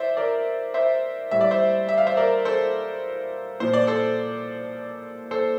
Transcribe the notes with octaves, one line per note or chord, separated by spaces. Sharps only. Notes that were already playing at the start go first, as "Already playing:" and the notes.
Already playing: C5 D5 E5
A#4 D5
C5 E5
A2 G3 E5
D5
C5 E5
E5
F5
C5 E5
A#4 D5
A4 C5
A#2 F3 C5
D5
A4 C5
A4 C5